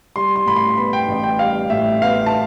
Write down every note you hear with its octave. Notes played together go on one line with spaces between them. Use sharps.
G3 C6
C6
A2 B5
C6
B3 B5
G5
A1
G5
G3 F5
A2 E5
B3 F5
A5